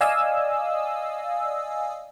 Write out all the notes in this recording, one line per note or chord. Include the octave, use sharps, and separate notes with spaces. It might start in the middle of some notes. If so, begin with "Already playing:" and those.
D5 D#5 F5 G#5 D#6 E6